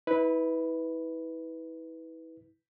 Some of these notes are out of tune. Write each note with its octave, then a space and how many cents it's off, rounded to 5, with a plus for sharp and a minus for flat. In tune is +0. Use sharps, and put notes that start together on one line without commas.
E4 -35 B4 +0